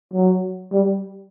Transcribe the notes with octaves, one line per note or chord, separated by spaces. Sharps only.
F#3
G3